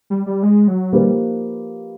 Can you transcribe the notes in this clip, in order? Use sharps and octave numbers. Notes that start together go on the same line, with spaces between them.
G3
G3
G#3
F#3
F3 G3 A#3 D#4 G4 B4